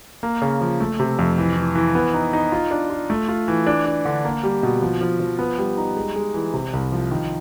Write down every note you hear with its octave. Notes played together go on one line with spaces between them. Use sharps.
A#3
C#3
F3
A3
C3
F2
E3
E3
E3
B3
D#4
D#4
F4
D4
F4
A3
F4
E3
D4
D4
D3
A#3
G3
B2
F3
F3
F3
B3
G3
D#4
G#3
G#3
E3
C3
C2
F3
D#3